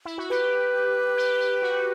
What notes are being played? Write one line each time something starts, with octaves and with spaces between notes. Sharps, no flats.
E4
F#4
G4 B4
G4
G4
F#4